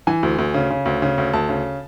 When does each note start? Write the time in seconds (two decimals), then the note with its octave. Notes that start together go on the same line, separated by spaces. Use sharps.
0.07 E3 G#5
0.23 D2
0.38 D2
0.54 C#3
0.70 C#3
0.86 D2
1.02 C#3
1.18 D2
1.33 D2 A5
1.49 C#3